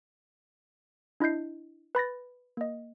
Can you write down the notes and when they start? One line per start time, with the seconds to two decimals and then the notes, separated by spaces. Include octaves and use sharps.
1.20 D4 E4 D#5 G6 C7
1.95 B4 B5 A6 A#6
2.57 A#3 D#5